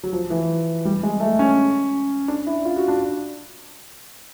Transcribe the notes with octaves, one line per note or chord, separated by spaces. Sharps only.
F#3
F3
E3
G3
G#3
A3
C#4
D4
E4
F4
F#4
D4